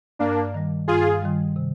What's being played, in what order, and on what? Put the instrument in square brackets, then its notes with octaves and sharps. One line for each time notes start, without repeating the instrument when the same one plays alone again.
[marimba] G2 [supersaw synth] A#3 D4
[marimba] D#3 G3
[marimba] G2 [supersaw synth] F4 G#4
[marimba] D#3 G3
C3